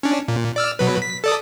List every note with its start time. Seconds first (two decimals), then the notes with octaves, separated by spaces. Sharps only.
0.03 C#4 D4
0.28 A#2
0.56 D5 E6 F6
0.79 B2 F#3 B4
1.02 B6
1.24 A4 D5 D#6